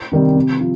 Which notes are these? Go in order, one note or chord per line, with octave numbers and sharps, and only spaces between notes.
C3 D#3 G3 C4
C3
F3